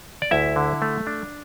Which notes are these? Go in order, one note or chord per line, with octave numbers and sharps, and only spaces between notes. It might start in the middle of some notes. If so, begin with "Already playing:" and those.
D5
D2 E4 E5
D3
A3
D4